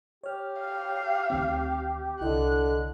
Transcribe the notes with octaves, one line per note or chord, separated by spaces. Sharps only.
G4 C#5 F6
F5
D2 D#3 C4
C2 D3 E4 D#5 F#6